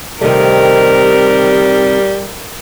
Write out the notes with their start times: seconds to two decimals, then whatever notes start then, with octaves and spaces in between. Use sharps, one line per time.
0.21 C3 D#3 G3 A3 A#4